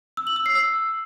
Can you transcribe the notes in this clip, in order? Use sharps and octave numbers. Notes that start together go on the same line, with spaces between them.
E6
F#7
E6
C7
E6